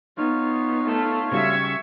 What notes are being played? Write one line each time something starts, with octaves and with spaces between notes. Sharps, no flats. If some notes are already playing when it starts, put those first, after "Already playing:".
B3 D#4 F4 C#5 F5
A3
C#3 G3 F#4 E5 C#6 G#6